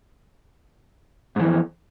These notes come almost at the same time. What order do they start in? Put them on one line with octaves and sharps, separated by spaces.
G#2 E3 F2